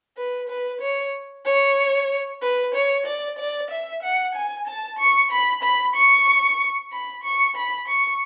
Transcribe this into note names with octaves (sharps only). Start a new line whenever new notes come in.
B4
B4
C#5
C#5
B4
C#5
D5
D5
E5
F#5
G#5
A5
C#6
B5
B5
C#6
B5
C#6
B5
C#6